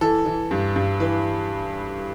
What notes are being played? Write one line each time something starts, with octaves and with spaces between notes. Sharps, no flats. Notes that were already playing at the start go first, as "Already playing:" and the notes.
E3 A4
E3
G2
G2
E3 B4